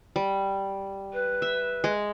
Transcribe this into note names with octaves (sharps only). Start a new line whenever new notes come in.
G3
B4
E5
G#3